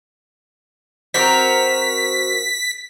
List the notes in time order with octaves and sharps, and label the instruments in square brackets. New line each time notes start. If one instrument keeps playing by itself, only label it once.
[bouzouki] C4 F#4 A#4 [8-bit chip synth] B6